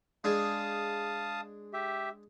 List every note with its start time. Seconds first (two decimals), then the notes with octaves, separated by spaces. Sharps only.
0.24 G#3 D4 G#4 F5 A5 D#6
1.73 G4 E5